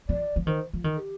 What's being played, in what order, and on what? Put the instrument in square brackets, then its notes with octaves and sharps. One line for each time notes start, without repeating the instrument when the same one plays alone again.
[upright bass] F3 [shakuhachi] D5
[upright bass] F3
[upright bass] D#3 [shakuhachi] C5
[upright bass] F3
D#3
[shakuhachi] A4
G4